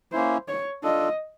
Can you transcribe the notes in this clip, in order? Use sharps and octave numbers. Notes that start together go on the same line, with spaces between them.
A#3 C#4 E4 C5
C#5
D4 F4 A4 D#5